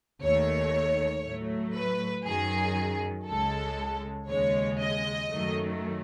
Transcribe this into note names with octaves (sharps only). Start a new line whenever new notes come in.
D#2 D#3 A3 C#5
A2 F#3 A3
B4
F#2 D#3 F#3 G#4
C#2 C#3 G#3 A4
D#2 C#3 G#3 C#5
D#5
F#2 D#3 F#3 A3